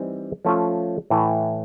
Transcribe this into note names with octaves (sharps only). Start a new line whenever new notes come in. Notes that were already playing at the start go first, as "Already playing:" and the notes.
Already playing: E3 G3 C4 D#4
F3 A3 C#4 F4
A2 E3 A3